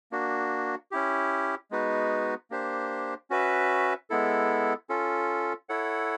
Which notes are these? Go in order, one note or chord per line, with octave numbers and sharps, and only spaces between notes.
A#3 D4 F#4
C#4 E4 G4
G#3 B3 D#4 F#4 B4
A#3 D4 G4 C5
C#4 F#4 B4 E5
G#3 B3 E4 A4
C#4 F4 A4
E4 A4 C#5 F#5